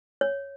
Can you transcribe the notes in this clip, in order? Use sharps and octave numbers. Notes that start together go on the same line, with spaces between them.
C#5